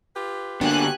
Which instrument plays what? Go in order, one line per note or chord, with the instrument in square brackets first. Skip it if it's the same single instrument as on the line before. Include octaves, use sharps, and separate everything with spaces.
[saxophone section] F4 G4 B4
[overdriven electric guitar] D3 B3 [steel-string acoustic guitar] A#3 D4 [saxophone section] F#4 [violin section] G4 G#5 F#6